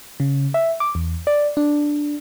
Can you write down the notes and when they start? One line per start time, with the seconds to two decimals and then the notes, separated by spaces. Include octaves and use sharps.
0.20 C#3
0.54 E5
0.80 D6
0.95 E2
1.27 D5
1.57 D4